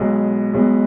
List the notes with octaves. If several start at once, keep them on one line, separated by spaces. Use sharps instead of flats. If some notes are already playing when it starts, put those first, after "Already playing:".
Already playing: B1 B2 G#3 B3
B1 B2 G#3 B3